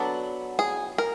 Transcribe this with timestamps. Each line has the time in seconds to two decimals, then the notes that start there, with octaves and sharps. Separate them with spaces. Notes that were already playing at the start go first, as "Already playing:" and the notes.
Already playing: F#3 B3 D4 A4
0.59 G#4
0.98 A#4